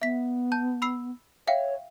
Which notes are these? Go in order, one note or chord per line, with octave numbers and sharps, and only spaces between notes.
B3 E5 B6
A5 G6
B5 E6 C7
C#5 E5 F5 G5